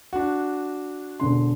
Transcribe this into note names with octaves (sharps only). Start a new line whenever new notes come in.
D4 F#4
E1 D3 C6